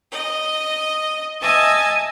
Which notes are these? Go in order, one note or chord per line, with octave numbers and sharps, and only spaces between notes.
D#5
D#5 E5 G#5 A5